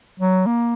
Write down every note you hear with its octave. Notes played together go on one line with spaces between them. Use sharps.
F#3
A#3